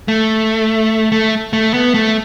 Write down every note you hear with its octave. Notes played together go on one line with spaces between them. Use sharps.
A3
A3
A3
B3
A3